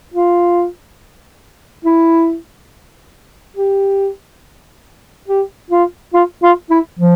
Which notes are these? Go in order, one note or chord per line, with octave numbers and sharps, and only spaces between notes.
F4
E4
G4
G4
F4
F4
F4
E4
F3